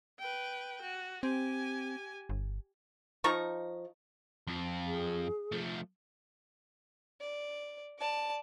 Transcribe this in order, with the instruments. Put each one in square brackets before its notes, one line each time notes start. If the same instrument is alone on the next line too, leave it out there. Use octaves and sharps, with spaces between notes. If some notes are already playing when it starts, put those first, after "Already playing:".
[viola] B4 G5
F#4
[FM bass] C4 [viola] G4 G#5
[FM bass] G1
[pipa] F3 D#4 A#5 C#6
[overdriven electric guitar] F2 F3
[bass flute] G#4
[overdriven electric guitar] F3 A3
[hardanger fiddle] D5
D5 A5